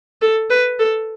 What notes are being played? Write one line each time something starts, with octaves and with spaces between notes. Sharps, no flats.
A4
B4
A4